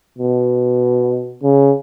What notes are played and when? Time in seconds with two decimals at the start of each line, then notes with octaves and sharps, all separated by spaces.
0.18 B2
1.43 C#3